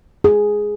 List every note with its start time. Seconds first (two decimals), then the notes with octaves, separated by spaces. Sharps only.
0.24 G#4